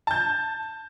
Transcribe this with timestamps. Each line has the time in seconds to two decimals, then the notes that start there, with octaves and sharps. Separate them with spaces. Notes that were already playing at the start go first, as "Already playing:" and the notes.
0.07 A5 G6